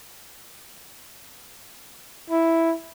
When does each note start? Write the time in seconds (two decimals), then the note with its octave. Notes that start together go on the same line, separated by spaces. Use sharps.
2.30 E4